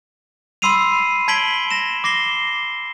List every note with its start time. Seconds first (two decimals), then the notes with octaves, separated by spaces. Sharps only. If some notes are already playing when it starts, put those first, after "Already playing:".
0.62 B5 C6 E6 C7 D#7 F7
1.28 A5 G#6 B6 D7 F#7 G7
1.71 A#6 E7
2.04 D6 A#6 C7 G7